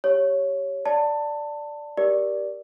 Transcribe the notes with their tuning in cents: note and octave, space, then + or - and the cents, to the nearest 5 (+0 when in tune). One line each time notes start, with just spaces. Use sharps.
G4 +0 C#5 +0
D5 +0 A5 +20
G4 +0 A#4 +25 D5 +0